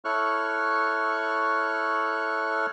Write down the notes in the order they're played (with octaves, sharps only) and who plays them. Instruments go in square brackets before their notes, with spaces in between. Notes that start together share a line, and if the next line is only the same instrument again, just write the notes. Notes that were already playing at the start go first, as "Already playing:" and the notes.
[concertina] E4 A4 C#5 C#6 F6 F#6